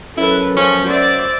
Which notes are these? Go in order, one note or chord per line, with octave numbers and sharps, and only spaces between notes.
F#2 E4 A4 B4
F3 C#4
F#3 C5 D5 E5